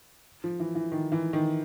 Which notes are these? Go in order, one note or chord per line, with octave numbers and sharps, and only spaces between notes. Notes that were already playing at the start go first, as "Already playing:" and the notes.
F3
E3
E3
D#3
E3
D#3